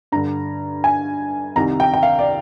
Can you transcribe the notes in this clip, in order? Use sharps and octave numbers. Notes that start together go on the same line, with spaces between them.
G2 D3 A#5
G#5
C2 C3 D#3 A#5
G5
G5
F5
D5